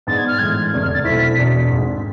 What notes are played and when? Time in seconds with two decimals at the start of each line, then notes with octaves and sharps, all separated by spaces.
0.07 G#2 G#3 B3 D4 A6
0.18 G#6
0.28 F6
0.39 A2 E3 G#3 G#6
0.72 F1 E2 D3 G#6
0.82 F6
0.94 A6
1.04 B1 B2 A3 C4 E4 B6
1.38 E1 E2 B2
1.70 G#1 G#2 G#3